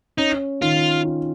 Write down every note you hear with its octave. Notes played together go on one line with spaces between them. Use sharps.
C#4 D#4
D#3 F4
F4